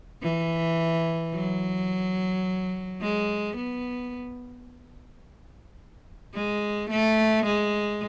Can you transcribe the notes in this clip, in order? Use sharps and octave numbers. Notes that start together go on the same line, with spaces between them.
E3
F#3
G#3
B3
G#3
A3
G#3